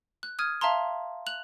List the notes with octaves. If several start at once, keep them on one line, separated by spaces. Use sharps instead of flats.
F#6
D#6 F6 G#6 D#7
E5 F5 A5 A#5 C6
F#6 F7 F#7